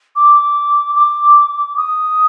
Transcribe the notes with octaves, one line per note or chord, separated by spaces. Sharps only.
D6
D6
D#6